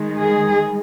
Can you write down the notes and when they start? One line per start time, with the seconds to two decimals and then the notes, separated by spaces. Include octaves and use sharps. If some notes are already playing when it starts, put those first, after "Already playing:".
Already playing: D#3 G#3
0.20 G#4